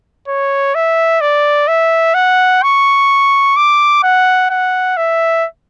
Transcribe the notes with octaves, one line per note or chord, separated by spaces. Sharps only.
C#5
E5
D5
E5
F#5
C#6
D6
F#5
F#5
E5